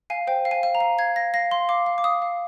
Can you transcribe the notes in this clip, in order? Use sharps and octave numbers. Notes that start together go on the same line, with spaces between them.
F5 G#5
C5 G5
F5
G#5
F5
A#5
F5
F5 G#6
F5 A#6
F5 A#6
F5 C6
F5 D6
F5
D6
F5 D#6
F5